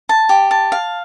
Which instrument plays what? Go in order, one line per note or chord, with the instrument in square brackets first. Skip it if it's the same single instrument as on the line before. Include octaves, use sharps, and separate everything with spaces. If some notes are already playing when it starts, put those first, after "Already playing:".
[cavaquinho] A5
G4
A5
F5